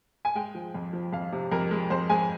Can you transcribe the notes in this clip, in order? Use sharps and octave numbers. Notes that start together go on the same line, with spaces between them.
G#5
G#3 G5
F3
F2
F3
F2 F5
C3
F2 A#4
G#3
F2 C5
G#3 G#5